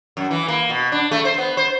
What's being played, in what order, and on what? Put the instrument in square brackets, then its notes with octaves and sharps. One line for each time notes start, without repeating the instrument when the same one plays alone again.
[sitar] F#2
E3
A#3
B2
D4
A3
C5
B3
C5